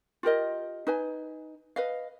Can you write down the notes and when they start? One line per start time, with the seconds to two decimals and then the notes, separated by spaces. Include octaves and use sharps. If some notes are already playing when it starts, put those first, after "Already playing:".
0.23 F4 G4 A#4 D#5
0.87 D#4 B4 G#5
1.76 B4 D#5 F5